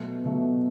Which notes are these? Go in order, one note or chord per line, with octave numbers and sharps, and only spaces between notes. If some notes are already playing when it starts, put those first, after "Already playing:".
Already playing: B2 F#3 A3
B2 F#3 A3